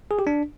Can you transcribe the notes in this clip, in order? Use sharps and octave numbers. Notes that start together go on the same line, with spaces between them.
G#4
G4
D4